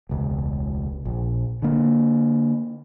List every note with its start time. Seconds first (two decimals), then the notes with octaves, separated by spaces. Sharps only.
0.09 E1 C#2
1.05 A#1
1.62 D3 A#3